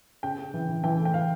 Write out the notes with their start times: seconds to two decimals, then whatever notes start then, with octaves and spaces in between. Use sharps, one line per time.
0.23 C#3 G5
0.38 C#3
0.54 E3
0.69 E3
0.84 E3 G5
0.99 A3
1.05 G5
1.14 E3 F5